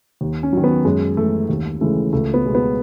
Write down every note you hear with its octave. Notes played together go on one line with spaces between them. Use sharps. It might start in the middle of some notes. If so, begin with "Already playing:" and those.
D#2
C#4
D#3 F#3
B3
F#2 G#3
E3 G#3 A3
D#2
C#3 E3 G#3 A3
C#2 A3
B3
B2 G#3
B3